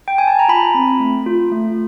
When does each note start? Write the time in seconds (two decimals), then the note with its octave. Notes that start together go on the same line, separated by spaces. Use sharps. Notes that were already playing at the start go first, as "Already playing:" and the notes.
0.08 G5
0.18 G#5
0.28 A5
0.39 A#5
0.48 F4 B5
0.74 C4
1.00 A3
1.26 F4
1.51 A3